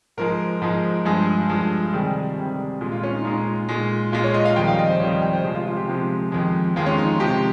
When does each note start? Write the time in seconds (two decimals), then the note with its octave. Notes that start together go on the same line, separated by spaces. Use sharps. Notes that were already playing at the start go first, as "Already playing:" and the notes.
0.17 G#2 F3 G#3 A#4
0.61 G#2 F3 G#3
1.05 G2 F3 G#3 G#4
1.50 G2 F3 G#3
1.93 C3 D#3 G3 G#4
2.37 C3 D#3 G3
2.81 A#2 G#3
2.92 F4
3.03 C#4
3.14 D#4
3.25 A#2 G#3 D#4
3.69 A#2 G#3
4.12 A#2 G#3 F4
4.24 C#5
4.34 D#5
4.45 F5
4.56 F2 D#3 G3 G5
4.67 F5
4.79 D#5
4.90 C5
5.00 F2 D#3 G3 C#5
5.11 D#5
5.22 G5
5.33 C5
5.44 C3 F3 G#3 G#4
5.55 F4
5.66 F4
5.77 G4
5.88 C3 F3 G#3
6.32 F2 D#3 G#3
6.76 F2 D#3 G#3 F4
6.86 C#4
6.98 D#4
7.20 C3 F3 G#3 G4